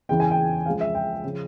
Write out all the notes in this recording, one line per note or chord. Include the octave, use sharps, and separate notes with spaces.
E2 C#3 E3 G5
G#5
G5
C#2 C#3 F3 F5
E5
G5
C#3 F3